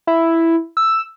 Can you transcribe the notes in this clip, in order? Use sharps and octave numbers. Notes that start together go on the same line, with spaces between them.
E4
E6